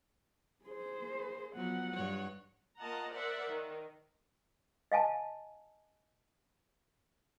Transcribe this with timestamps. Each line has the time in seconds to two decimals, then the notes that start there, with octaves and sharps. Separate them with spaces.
0.65 G#4 C5
0.99 A#3
1.56 F3 F#3 B3 F#5
1.94 G2 C#5
2.80 A#3 F4 D#5 F#5 A5 A#5
3.15 A#4 C5 D5 E5 F#5
3.50 D#3
4.92 D#5 F5 G#5 A5